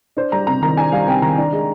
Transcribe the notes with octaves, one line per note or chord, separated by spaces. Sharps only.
D4 C5
G3 A#5
C3 A#5
D#3 A#5
D4 G#5
G3 F5
C3 G5
D#3 A#5
D4
G#3